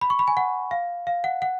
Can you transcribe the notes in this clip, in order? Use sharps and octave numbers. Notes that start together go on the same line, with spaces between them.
B5
C#6
B5
G#5
F#5
F5
F5
F#5
F#5